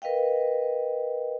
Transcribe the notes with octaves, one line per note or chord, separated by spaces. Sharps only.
A#4 B4 D#5 F5 G5